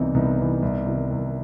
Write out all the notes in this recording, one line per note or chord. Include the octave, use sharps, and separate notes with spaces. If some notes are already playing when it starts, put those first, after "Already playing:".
Already playing: C2 C3 E3 B3 D#4
C2 B3 D#4
C3 E3
C2
C3 D#3
C2